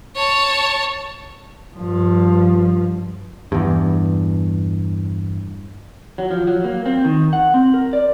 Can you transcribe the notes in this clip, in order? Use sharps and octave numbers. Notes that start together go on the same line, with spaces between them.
C#5 A5
G2 F3
E2 G2
F#3
F3
F#3
A#3
C4
D#3
F#5
C4
A#4
D5